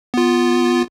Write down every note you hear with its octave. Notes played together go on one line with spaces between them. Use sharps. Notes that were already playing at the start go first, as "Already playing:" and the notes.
B3 F4